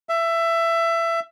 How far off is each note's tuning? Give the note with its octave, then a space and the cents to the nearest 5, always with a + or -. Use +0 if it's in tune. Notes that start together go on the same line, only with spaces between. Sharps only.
E5 +20